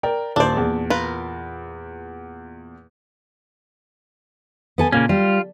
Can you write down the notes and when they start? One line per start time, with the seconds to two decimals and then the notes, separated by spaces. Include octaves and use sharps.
0.03 A#4 D5 G5
0.36 D#1 D4 C5 D5
0.57 E2 A#2
0.90 F4 A#4 B4
4.78 B3 A4 G#5
4.92 A#2 C#3 A#3 C#4
5.09 G3 F4